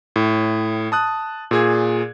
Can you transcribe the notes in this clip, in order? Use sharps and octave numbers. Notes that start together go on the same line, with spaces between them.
A2
A5 D#6 F#6
A#2 G#4 G#6